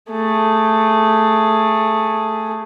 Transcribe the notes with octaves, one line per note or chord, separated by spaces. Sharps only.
A3 G#4